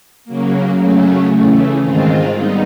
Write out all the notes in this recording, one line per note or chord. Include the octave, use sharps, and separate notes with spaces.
C#3 F#3 A#3
C#3 F#3 A3 C#4
C#3 E3 A3
G#2 D#3 G#3 C4 F4
G3 B3 D#4